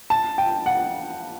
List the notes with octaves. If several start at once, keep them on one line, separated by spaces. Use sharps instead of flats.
A5
G5
F#5